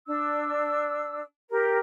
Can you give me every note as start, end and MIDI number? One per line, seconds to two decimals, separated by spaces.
0.07 1.20 62
0.07 1.20 88
1.50 1.78 67
1.50 1.78 70